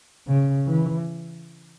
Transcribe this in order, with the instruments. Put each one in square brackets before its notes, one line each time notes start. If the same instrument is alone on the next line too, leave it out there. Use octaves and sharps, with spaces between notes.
[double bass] C#3
E3